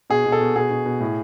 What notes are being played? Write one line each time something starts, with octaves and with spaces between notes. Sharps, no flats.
B2 G#4
B2
A4
B2
B2 G#4
B2
B2
A2